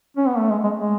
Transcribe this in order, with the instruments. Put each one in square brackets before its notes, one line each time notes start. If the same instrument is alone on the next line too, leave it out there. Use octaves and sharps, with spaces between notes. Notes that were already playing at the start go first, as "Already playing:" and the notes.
[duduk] C#4
B3
A3
G#3
G#3
G#3